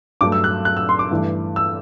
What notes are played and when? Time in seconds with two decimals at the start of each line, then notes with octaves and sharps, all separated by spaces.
0.21 G2 F#3 A3 D6
0.32 E6
0.44 F#6
0.65 F#6
0.77 E6
0.89 C6
0.99 D6
1.11 G2 E3 A3
1.56 E6